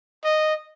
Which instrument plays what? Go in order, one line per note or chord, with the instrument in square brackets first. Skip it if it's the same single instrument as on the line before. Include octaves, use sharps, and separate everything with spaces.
[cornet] D#5